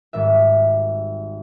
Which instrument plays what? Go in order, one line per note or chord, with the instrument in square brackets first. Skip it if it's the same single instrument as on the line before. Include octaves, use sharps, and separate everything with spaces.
[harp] G#1 G#2 D#3 G3 E5